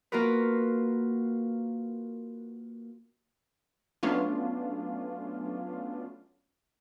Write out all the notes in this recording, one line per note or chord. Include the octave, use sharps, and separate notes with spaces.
A#3 F4 F#4 A#4 B4
F#3 A3 B3 C#4 D4 F4